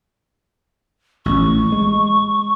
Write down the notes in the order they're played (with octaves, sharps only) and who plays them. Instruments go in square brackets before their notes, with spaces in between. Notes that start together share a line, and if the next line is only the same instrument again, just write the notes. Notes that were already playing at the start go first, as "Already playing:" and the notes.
[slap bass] A1 [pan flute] C#6
[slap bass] G#3